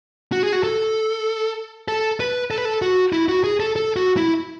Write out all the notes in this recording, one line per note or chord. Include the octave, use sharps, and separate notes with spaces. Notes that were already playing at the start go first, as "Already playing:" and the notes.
F#4
G#4
F#4
A4
A4
B4
A4
B4
A4
F#4
E4
F#4
G#4
A4
A4
F#4
E4